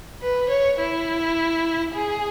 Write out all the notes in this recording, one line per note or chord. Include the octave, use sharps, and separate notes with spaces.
B4
C#5
E4
G#4